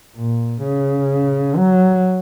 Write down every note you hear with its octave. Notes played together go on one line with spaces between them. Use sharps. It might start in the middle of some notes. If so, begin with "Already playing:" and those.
A#2
C#3
F#3